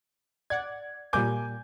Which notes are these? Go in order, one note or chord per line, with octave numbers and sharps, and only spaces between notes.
D5 F#5 G#6
A#2 G3 A#3 G#5 D6 G6